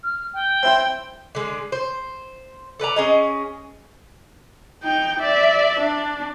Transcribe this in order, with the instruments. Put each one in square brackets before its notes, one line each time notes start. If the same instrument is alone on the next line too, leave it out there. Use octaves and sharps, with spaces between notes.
[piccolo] F6
G5
[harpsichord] C4 E4 C6
[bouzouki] D3 G#3
C5
A4 B4 D5 A#5
C#4 G#4 D#5
[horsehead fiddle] D#4 G5
D5 E5
D4